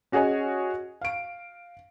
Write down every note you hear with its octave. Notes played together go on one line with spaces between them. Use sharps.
C#4 F#4 G#4 C#5 D#5 G#5
F5 D7